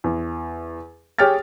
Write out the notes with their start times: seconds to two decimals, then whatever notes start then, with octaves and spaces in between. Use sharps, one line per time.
0.04 E2
1.19 G4 G#4 C#5 G5 F6 A6